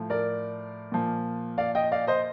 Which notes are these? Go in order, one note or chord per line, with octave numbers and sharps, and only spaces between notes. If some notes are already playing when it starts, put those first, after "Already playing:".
Already playing: A2 F3
A#4 D5
A#2 F3
D5 F5
D#5 G5
D5 F5
C5 D#5